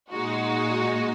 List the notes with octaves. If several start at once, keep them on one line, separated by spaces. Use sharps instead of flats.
A#2 G#3 D#4 F#4